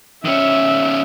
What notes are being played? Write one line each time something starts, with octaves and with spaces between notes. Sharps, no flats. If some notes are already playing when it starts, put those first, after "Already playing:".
D#3 C#4 E5